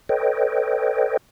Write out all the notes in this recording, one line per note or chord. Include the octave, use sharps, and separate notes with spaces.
A4 B4 C#5 D#5 G5